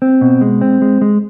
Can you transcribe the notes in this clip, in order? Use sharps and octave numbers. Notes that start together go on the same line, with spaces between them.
C4
B2
G#3
C4
G#3
G#3